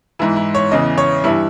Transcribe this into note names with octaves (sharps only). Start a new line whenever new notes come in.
G#2 E3 E4
E4
C#5
E2 C#3 E3 D#5
C#5
G2 E3 E4